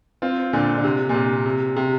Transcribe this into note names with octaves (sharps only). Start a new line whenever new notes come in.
C4 F4
A#2 D3
D3
C3
A#2
C3
C3
C3